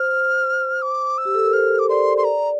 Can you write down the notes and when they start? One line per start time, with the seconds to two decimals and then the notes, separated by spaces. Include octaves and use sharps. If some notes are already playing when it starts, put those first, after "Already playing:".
Already playing: C5 F6
0.82 D6
1.18 E6
1.25 G4
1.35 A4
1.44 A#4
1.53 C5 F6
1.79 D6
1.89 D5 C6
2.17 C6
2.24 D5 A#5